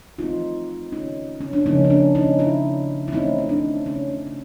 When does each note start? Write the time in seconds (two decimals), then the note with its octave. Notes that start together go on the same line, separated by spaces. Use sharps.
0.18 E3 A3 C4 D#4 F4
0.92 C#4 D#4
1.41 C#4
1.53 D4
1.66 C#3 F3 A#3 C#4 D#4
1.85 C#4
1.90 D4
2.15 C#4 D#4
2.39 D4 E4
3.08 E4
3.12 E3 A3 C4 C#4 D#4
3.38 D#4
3.49 D4
3.86 C#4
4.11 C#4
4.27 C#4